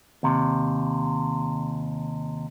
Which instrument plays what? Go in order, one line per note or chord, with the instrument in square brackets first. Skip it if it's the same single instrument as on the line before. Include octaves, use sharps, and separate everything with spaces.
[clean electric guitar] D#2 C3